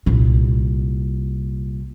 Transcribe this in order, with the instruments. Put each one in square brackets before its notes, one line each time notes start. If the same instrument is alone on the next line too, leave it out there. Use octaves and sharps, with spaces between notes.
[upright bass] C2 A#2